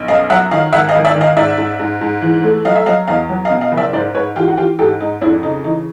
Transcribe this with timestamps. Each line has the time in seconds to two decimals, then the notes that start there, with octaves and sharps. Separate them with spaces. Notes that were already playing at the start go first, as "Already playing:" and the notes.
Already playing: B1
0.08 F#2 D#5 F5
0.30 F#3 E5 F#5
0.51 D#3 D#5 F5
0.73 G#1 E5 F#5
0.89 D#5 F5
0.94 G#1
1.05 D5 E5
1.15 D#3
1.21 D#5 F5
1.37 G#2 D5 E5
1.58 G#2
1.79 G#2
2.01 G#2
2.22 E3
2.43 A3
2.65 F#3 D#5 F5
2.76 E5
2.86 F#3 D#5 F5
3.08 E2 D#5 F5
3.29 F#3
3.45 D#5 F5
3.51 B2
3.61 D#5 F5
3.72 F#1
3.77 D5 E5
3.93 G#2 C5 D5
4.15 G#2 B4 C#5
4.36 E3 F4 G4
4.48 F#4
4.57 E3 F4 G4
4.79 G#2 G4 A4
5.00 G#2 D#4
5.21 F2 D4 E4
5.43 C#3 D#4
5.64 E3 D#4